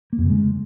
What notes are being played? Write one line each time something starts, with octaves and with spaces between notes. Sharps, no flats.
A#3
F2
C#3
G#3